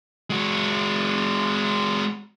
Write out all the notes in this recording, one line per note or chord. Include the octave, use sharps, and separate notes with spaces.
G#3 F#4